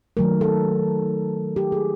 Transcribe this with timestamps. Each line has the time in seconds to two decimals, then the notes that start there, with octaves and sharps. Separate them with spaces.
0.17 D#3 F#3 A3 A#4
0.41 A4
1.56 G4
1.72 G#4